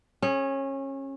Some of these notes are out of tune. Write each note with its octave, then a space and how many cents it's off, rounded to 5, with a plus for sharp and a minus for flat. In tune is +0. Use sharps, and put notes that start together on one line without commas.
C#4 -25 G#4 +5